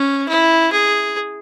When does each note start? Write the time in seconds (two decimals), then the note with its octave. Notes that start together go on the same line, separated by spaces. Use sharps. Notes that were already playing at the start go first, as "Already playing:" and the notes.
Already playing: C#4
0.28 E4
0.72 G#4